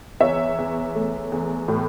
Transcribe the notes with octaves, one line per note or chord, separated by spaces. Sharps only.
E2 C#5 E5
E2
A3
E2
A2